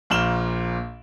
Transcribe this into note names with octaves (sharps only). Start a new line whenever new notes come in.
A#1 A#2 F6 E7 F#7 G7